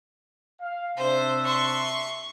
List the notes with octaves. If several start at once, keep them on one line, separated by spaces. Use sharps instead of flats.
F5
C3 D4 C5 E5
C6 C#6